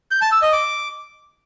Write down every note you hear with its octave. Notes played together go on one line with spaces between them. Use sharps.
G6
A5
E6
D#5
D6